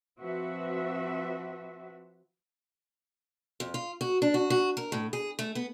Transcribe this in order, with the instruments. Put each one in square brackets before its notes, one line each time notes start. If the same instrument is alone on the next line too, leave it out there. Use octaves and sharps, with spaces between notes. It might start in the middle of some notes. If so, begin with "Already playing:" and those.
[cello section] F3 C4 F#4 B4 E5
[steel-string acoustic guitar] F2
F4
F#4
D4
F#4
F#4
A#4
A2
G#4
A3
B3